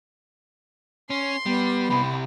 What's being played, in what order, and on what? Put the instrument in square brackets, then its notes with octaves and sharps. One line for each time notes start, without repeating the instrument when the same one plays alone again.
[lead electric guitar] C#4 [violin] C6
[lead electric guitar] G3 [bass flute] B3
[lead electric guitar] C2 G3 [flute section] B5